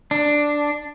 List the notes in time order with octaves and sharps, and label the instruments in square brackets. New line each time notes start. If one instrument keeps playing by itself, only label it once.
[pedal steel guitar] D4